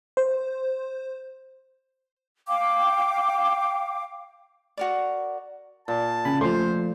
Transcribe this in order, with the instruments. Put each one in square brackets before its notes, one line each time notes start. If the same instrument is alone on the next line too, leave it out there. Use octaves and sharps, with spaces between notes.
[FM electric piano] C5
[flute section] F5 G5 D6
[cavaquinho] F#4 A#4 D5
[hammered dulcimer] A#2 [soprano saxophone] A5
[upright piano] C#3 [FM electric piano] G#5 B5
[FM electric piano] F3 A3 [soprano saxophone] C5 [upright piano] C6